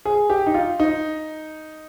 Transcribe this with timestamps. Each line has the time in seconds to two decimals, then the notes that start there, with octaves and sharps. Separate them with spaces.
0.05 G#4
0.30 G4
0.47 D#4
0.54 F4
0.80 D#4